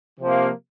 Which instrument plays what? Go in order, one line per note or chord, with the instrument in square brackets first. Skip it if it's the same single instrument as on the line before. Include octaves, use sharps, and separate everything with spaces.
[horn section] C3 F3 A#3